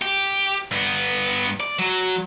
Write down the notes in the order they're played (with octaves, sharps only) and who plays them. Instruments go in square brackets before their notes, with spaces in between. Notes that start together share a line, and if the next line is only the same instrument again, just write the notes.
[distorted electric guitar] G4
G2 B3
D5
F#3